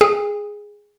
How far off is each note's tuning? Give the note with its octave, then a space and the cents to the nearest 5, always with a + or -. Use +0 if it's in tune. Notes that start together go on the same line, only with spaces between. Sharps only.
G#4 +0 G#5 -45